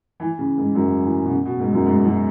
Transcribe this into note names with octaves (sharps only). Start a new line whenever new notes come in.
E3
C#3
G#2
F#2
E3
B2
C#3
B2
G#2
F#2
G#2
F#2